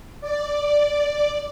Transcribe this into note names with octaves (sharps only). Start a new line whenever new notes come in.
D5